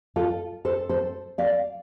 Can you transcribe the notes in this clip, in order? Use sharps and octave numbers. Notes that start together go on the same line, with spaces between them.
F4 A4
A4 C5
A4 C5
D5 F5